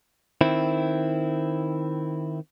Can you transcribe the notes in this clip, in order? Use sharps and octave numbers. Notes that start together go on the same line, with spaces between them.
D#3 C4 E4